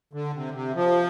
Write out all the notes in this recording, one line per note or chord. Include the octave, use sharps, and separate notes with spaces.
D3
C3
C3
F3